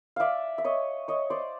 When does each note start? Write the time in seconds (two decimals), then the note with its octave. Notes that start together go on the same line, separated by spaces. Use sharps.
0.16 D5 E5 F5
0.58 E5
0.64 C#5 D#5
1.08 C#5 D#5
1.30 C5 D5